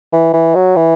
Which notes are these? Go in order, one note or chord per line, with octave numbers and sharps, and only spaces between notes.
E3
E3
F#3
E3